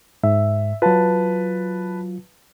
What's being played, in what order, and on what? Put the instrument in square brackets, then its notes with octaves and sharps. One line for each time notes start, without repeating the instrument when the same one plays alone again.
[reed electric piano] G#2 [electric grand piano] E5
[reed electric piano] F#3 F4 [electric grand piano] B4 A5